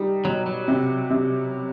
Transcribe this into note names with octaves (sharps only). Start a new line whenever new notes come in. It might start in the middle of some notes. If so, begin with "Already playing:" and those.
Already playing: G3 D#4
B2 F#3
F#3
C3
C3